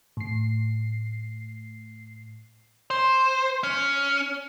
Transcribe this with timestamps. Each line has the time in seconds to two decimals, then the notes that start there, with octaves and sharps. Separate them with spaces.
0.17 A2 C7
2.90 C5
3.63 C#4